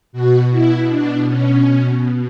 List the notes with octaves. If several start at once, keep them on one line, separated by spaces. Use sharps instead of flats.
B2 F#4
E4
D4
C#4
B2